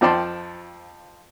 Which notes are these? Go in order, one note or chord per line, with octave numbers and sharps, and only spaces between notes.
F2 F3 D5 G5 A5 C6